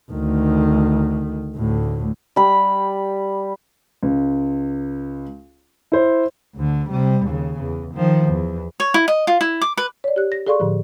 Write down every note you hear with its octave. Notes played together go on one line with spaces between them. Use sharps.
D2 D#3
D2 A2
G3 B5
C#2
E4 C5
D2 D3
C3 G3
D#2 C#3
E2
D#3 F3
E2
C#5
E4
D#5
F4
E4
D6
B4
C#5 D5
G4 F#6
A#6
G#4 A4 D5 F5 C6 C#6
A2 D3 F3